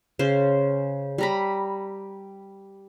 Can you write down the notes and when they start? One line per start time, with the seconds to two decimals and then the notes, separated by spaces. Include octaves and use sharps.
0.19 C#3 C5
1.18 G3 A#5 B5